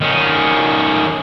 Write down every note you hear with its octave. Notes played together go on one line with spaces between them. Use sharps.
D#3 C#4